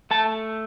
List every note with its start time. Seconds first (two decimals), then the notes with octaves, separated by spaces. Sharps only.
0.11 A3 A5